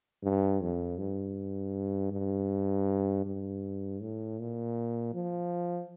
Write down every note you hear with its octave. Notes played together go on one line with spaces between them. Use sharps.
G2
F2
G2
G2
G2
A2
A#2
F3